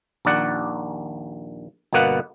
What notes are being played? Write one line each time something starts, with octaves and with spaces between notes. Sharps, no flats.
A#1 D#2 D5 F#5
G1 B2 A#3 B3 B4 F#5